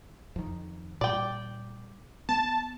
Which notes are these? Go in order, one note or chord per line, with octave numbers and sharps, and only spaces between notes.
F2 D#3
A#2 G3 D5 G5
B3 A5